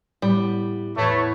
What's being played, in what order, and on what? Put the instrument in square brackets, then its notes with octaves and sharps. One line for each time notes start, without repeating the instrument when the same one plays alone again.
[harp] A2 B3 [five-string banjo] G3
[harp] E2 A2 [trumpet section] A3 [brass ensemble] B4 C#5